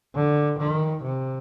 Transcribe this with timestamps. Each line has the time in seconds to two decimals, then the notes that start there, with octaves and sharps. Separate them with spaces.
0.15 D3
0.59 D#3
1.04 C3